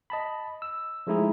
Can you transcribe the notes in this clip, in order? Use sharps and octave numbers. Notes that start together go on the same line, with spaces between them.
D#5 A5 B5
E6
F3 G#3 A3 D#4 E4 G#4